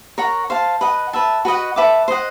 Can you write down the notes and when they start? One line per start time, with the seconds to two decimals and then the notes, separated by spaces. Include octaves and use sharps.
0.18 A#4 C#5 F#5 A#5
0.50 C5 F5 A5
0.81 B4 D#5 F#5
1.13 B4 E5 A5
1.45 F#4 B4 D#5 F#5
1.76 B4 E5 A5 D6
2.08 C5 D#5 F#5